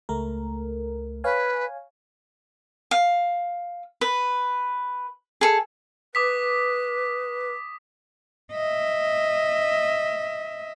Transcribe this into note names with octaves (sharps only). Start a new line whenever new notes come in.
C#2 A3 A#4
B4 C#5 F5 G#5
F5
B4
G#4 A4
B4 D6 D#6 B6
D#5 E5